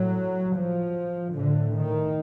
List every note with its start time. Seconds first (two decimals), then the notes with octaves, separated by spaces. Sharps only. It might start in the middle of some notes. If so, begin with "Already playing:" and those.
Already playing: A2 F#3
0.54 F3
1.35 A2 D3
1.75 D#3